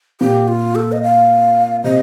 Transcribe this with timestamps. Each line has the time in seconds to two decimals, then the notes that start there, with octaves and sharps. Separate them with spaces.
0.21 A#2 G4
0.48 F4
0.75 A4
0.92 D#5
1.03 F5
1.84 C3 D#5